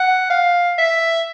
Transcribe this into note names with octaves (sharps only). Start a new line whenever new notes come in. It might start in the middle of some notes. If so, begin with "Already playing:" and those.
Already playing: F#5
F5
E5